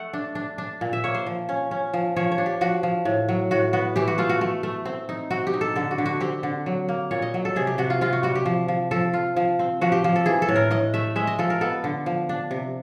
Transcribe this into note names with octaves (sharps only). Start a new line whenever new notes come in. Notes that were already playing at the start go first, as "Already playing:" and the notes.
Already playing: A3 F#5
D4
D4
D4
A#2
E5
A#3 C#5
C5
F3
C#4
C#4
F3
F3 C#5
C#5
D4
G4
F3 F#4
F3
A2
F#3
A2 F#4
B3 F#4
E3 G4
F#4
A3 F4
F#4
A3
A3
C4
D#4
C4 F#4
G4
D#4
A4
D3 A4
F#4
D3
F#4
C4 G4
D3
F#3
A#3
A#2 C#5
D#5
F#3
A4
C3 G#4
G4
C3 F#4
F4
C3 F4
F#4
G3 F#4
G4
F3
F3
F3 A4
F4
F3
C4
F3 F#4
G4
F3
A4
E3 G#4
A4
A2
A#4
A2 D#5
A3 E5
G#3 E5
D#5
F3 A4
A#4
B3 A4
D3
F3
D4
C3